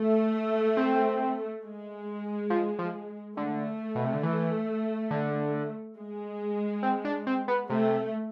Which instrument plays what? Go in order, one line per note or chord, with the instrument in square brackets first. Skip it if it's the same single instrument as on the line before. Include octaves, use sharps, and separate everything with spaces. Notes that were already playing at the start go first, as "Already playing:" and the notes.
Already playing: [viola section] A3
[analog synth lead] C4
[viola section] G#3
[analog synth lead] F3
F3
[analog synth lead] D3 [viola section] A3
[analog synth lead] B2
C3
D3
E3
D3
[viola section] G#3
[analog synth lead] C4
D4
C4
B3
[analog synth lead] C3 [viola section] A3